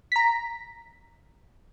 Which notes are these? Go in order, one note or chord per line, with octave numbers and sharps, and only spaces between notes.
A#5 B6